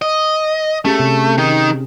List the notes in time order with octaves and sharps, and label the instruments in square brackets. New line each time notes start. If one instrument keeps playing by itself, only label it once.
[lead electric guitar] D#5
[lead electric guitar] A3 [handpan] C#4 G4 G#4
[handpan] C3 C4 G4
[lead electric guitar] D#3 D#4